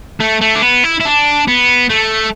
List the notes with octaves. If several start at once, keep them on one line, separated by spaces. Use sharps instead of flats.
A3
A3
D4
B3
E4
E4
D4
B3
A3